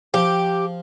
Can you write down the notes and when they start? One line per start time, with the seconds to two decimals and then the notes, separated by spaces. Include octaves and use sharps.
0.14 F3 G4